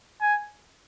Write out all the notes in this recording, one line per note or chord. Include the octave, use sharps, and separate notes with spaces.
G#5